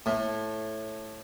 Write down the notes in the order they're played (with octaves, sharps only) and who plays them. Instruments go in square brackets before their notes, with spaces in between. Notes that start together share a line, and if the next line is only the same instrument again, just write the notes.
[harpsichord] A2